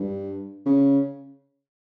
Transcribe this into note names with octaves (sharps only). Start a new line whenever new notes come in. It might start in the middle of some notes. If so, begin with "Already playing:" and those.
Already playing: G2
C#3